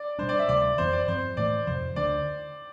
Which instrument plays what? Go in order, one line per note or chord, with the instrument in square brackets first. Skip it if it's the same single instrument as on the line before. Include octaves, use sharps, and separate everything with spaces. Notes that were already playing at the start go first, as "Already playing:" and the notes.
Already playing: [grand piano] D5
[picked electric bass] B2 G3 D4 [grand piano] C5
[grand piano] D5
E5
[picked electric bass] D2 C3 G3 [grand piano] D5
[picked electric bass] F2 E3 B3 [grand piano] C5
[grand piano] D5
[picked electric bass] G2 F3 C4 [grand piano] C5
[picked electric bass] A2 E3 A3 [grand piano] D5
[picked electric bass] F2 C3 F3 [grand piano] C5
[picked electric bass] D2 D3 A3 D4 [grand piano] D5